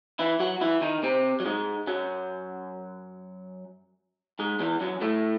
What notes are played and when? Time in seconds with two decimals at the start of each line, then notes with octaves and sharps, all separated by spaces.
0.19 E3 E4
0.40 F#3 F#4
0.61 E3 E4
0.81 D#3 D#4
1.03 C3 C4
1.40 F#3
1.45 G#2 G#3
1.87 F#2 F#3
4.39 G#2 G#3
4.60 E2 E3
4.81 F#2 F#3
5.01 A2 A3